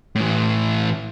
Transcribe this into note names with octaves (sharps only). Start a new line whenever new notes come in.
A2 E3